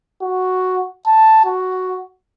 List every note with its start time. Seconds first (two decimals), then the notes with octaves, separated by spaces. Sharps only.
0.22 F#4
1.07 A5
1.45 F#4